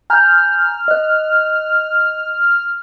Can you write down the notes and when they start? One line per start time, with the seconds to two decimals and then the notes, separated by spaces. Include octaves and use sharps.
0.10 G#5 A#5 F6 G6
0.88 D#5 F#6